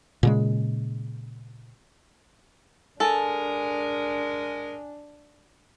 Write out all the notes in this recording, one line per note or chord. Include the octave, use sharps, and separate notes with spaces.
A#2 C#3 G#3
G#3 D4 A4 A#4 G#5